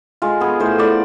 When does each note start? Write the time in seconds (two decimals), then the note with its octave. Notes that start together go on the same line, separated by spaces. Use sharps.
0.22 G#3 F4
0.40 B3 G#4
0.60 A2 C5
0.78 A2 D5